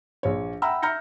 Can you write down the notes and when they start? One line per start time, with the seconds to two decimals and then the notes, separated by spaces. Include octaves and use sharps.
0.23 A#1 C#5
0.62 E5 F#5 G5 A#5 B5 E6
0.82 E5 A#5 F6 G6 A#6 C#7